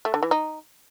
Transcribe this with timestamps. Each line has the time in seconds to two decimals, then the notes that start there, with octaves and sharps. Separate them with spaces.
0.05 A3
0.14 D3
0.23 E3
0.31 D#4